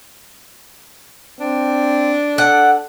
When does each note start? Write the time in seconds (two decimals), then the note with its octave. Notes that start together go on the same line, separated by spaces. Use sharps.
1.40 C4 D4
2.38 A4 F#5